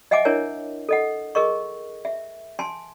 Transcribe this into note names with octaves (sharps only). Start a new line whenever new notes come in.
D#5 E5 F#5 G#5 D6
D4 E4 A#4 C#5 G#5
A4 D#5 F#5
G#4 A#4 D#5 C#6
E5
G#5 A5 C6